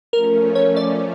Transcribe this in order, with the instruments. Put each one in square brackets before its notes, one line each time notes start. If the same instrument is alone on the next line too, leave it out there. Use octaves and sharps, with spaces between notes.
[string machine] F3 A3 C#4 [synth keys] A#4
[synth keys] C#5
D5